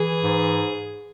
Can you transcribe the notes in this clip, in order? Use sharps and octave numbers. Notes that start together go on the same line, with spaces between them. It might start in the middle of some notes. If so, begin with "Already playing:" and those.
Already playing: E3 G#4
G#2